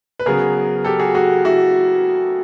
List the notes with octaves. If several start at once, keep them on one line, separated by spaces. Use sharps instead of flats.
B4
C#3 F#3 B3 G#4 A#4
G4 A4
F#4 G#4
F#4 G#4
E4 F#4